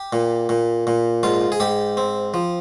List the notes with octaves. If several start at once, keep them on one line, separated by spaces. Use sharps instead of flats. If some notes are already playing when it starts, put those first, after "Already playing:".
Already playing: G4
A#2
A#2
A#2
G#2 F4
G#4
G#2 G4
C4
F3